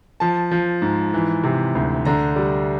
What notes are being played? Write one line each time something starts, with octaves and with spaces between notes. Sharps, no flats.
F3 A5
F3
G#2
E3
C3
D2
D3 A#5
G3